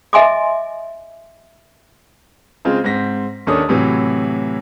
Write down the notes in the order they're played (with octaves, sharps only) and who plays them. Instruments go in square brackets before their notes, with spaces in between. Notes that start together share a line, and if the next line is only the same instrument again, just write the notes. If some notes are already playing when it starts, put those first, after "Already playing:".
[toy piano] D#5 E5 G#5 C6 D6
[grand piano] C#3 G#3 C4 F4
G#2 C4 A#6 B6
D#2 D#3 C#4 D4 A4 D#6
A2 C3 E3 F#3